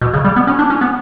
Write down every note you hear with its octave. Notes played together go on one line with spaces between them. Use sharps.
B2
C#3
G3
B3
C#4
D4
C#4
B3